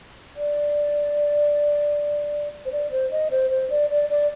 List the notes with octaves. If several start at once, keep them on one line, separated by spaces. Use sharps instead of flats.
D5
C5
D5
C5
D#5
C5
C5
D5
D5
D5